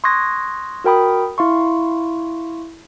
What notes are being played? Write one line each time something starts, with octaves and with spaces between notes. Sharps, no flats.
C6 C#6 D#6 F#6 G#6 A#6
F#4 A#4 G5 B5 D#6
E4 F5 C6 C#6